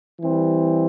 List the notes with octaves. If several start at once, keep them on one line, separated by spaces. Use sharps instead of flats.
E3 G3 C4